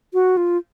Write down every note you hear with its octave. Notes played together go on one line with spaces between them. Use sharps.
F#4
F4